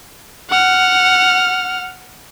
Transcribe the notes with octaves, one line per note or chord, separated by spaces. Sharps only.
F#5 F6